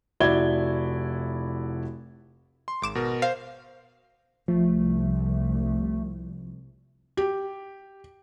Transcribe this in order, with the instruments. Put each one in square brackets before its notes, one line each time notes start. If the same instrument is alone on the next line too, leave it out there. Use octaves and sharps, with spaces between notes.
[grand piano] F1 E4 F#4 D5 G#6 G7
[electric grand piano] C6
[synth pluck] G#1 D6 E7
[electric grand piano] B2 A#4
[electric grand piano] C5 [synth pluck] F5
[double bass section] C2 [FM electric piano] F3 [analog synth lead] A3
[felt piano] G4